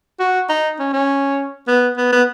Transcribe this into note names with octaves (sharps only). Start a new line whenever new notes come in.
F#4
D#4
C#4
C#4
B3
B3
B3